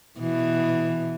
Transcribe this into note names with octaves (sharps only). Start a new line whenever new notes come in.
B2 E3